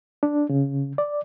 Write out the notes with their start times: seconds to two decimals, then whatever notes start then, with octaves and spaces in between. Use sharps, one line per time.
0.23 D4
0.49 C#3
0.98 D5